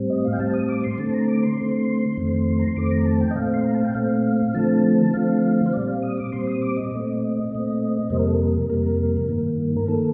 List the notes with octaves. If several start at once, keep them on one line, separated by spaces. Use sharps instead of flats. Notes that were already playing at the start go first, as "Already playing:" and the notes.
Already playing: A2 G3 C4
D#5
F5
G5
A2 G3 C4 A5
D#6
D6
C6
D3 A3 C4 A5
A#5
D6
C6
D3 A3 C4
F2 D#3 A3 C4
A#5
C6
F2 D#3 A3 C4 D6
A#5
A5
G5
D#5
A#2 A3 C4 F5
C6
A#5
A5
G5
A#2 A3 C4 F5
D3 F3 A3 C4 A5
D3 F3 A3 C4 F5
C5
A#2 G3 C4 D5
F5
D#6
D6
A#2 G3 C4 C6
D#6
D6
D#5
A#2 A3 C4
A#2 A3 C4
F2 C3 G3 A#3 C5
A#4
A4
A#4
F2 C3 G3 A#3 A#4
G2 D#3 A#3
A#4
D#3 A#3 A4